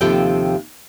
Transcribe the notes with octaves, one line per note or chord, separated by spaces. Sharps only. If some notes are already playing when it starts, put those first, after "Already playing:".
D#2 C3 F3 G4 A4 G5